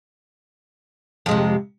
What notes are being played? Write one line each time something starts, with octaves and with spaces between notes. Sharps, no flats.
F2 C3 G#3